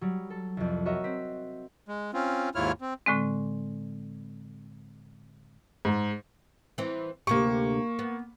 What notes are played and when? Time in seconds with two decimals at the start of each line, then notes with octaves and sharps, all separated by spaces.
0.01 F#3 G3
0.30 A4
0.57 C2 F2
0.86 F#4 A#4 C#5 D#5 E5
1.04 C4 B6
1.88 G#3
2.14 C4 C#4 F4
2.55 D#2 G#2 E4 F4 C#5 F6
2.81 C4
3.06 A2 D3 G#3 C4
5.85 G#2
6.78 E3 C4
7.27 D2 C3 A#3 G4 C#6
7.99 B3